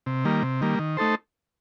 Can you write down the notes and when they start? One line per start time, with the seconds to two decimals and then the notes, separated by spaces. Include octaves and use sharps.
0.06 C3
0.25 D#3 G3 A#3
0.43 C3
0.61 D#3 G3 A#3
0.79 D#3
0.97 A3 D#4 A4 C5